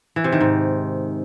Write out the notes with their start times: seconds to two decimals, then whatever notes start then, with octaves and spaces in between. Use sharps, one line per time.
0.16 E3
0.24 C3
0.32 D#3
0.41 G#2